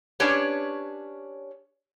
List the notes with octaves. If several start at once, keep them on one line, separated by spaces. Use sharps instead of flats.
C#4 D4 G4 B4 C#5